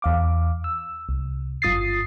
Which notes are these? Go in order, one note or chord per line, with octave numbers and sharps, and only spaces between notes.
E2 F5 D6
E6
C2
G1 F#2 F4 D#6 A6 C7